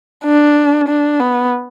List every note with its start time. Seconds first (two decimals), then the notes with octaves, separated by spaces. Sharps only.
0.24 D4
0.88 D4
1.20 B3